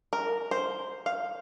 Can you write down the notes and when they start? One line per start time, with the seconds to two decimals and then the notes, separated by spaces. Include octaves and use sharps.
0.13 A#4
0.51 C5
1.06 F5